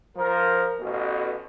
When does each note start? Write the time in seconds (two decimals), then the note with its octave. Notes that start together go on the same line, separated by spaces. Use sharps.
0.16 F3 A#4
0.79 A1 B2